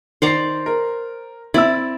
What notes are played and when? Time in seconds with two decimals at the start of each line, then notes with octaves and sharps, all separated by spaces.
0.22 D#3 C5 D5 A#5 C7
0.66 A#4
1.54 C4 E4 D5 B5 E6